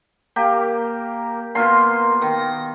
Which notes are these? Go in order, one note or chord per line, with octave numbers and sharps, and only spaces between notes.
A#3 G4
B2 A#3 F4 C6
D#3 A#6